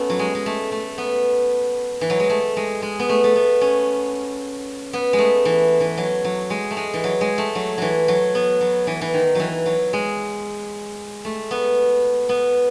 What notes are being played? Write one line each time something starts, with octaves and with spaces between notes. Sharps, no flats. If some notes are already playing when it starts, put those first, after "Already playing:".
Already playing: A3 B3 C#4
F#3
G#3
G#3
A3
A3
B3
E3
F#3
G#3
A3
G#3
G#3
B3
A3
A3
B3
C#4
B3
G#3
A3
E3
E3
F#3
F#3
G#3
A3
G#3
E3
F#3
G#3
A3
F#3
E3 F#3
F#3
B3
F#3
E3
E3
D#3
E3 F#3
F#3
G#3
A3
B3
B3